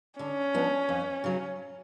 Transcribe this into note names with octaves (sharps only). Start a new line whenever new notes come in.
D3 C#4
F3 B3 D4
F2
C#3 F#3